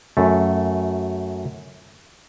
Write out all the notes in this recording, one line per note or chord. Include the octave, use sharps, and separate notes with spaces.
F#2 A3